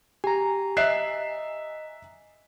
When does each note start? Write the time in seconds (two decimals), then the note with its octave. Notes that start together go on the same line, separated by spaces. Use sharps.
0.24 G4 G#5 A#5
0.77 D#5 E5 F#6 C7